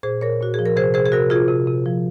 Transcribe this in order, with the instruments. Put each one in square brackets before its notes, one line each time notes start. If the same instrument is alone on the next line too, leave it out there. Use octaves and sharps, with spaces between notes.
[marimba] A#2 G#4 C5
A#2 A#4 C#5
A#2 F#4
F3 G#4
A#4
C3 G#4 C5
C3 G#4 C5
G#4
C3 F#4 A#4
C3 F4 G#4
C3
C3
F3